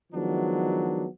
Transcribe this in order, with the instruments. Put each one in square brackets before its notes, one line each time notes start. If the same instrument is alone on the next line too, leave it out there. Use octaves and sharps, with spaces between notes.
[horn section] D#3 F3 F#3 G#3 B3 D4